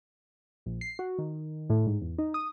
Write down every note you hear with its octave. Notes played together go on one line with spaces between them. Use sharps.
A#1
C7
F#4
D#3
A2
G#2
E2
D#4
D#6